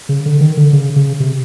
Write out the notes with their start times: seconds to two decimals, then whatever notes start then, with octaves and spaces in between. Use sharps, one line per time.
0.09 C#3
0.26 D3
0.40 D#3
0.57 D3
0.73 C#3
0.96 C#3
1.20 C3